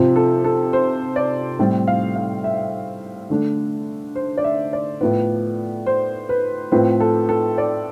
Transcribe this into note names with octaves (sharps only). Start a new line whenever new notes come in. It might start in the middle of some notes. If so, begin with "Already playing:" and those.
Already playing: C3 F3 C4
A4
A4
C5
D5
A2 G3 C4
F5
F5
E5
D3 A3 D4
C5
D5
E5
D5
A2 F3 B3
C5
B4
A2 F3 C4 B4
A4
A4
D5